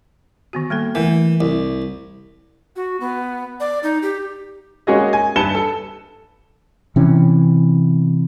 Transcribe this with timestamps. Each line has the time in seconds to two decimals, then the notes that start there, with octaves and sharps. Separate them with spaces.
0.53 D#3 B3 F#4
0.70 G3 A#3 A4
0.95 E3 A3 A#4
1.41 C2
2.76 F#4
3.00 B3
3.60 D5
3.83 D#4
4.02 G4
4.87 G#3 A#3 C#4 F#4 G#4 D#5
5.13 G#5
5.36 G2 B4 A5 C#7 E7 G7
5.55 A4
6.96 C3 E3 C#4